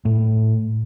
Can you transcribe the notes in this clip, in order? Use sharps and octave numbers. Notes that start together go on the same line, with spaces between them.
A2